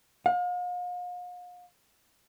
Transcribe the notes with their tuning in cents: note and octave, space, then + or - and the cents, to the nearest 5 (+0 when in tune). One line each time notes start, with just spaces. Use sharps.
F5 +40